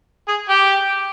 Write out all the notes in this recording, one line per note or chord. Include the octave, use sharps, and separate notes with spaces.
G#4
G4